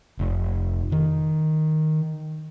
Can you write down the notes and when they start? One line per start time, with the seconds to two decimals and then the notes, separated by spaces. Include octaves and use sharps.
0.19 F1
0.92 D#3